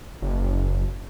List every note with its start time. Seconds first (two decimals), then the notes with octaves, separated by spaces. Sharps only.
0.22 F#1